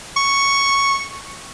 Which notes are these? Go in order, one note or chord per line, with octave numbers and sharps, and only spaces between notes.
C#6